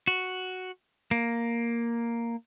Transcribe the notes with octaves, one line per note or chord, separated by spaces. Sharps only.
F#4
A#3